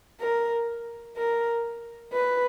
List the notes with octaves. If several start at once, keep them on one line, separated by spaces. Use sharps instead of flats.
A#4
A#4
B4